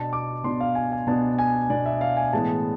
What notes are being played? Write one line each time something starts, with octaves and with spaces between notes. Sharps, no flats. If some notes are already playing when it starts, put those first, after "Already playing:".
Already playing: B2 B3 D4 A5
D6
B2 B3 D4 C6
F5
G#5
G#5
B2 B3 D4 A5
G#5
B2 B3 D4 D5
E5
F5
G#5
A2 E3 G#3 B3 A5